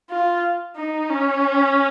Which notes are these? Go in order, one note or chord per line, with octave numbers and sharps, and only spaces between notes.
F4
D#4
C#4